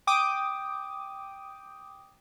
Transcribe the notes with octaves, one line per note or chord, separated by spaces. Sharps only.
G5 D6 D#6